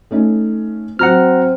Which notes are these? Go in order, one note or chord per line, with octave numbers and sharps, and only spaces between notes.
A3 C#4 D#4
F#3 C4 F#5 A#5 F6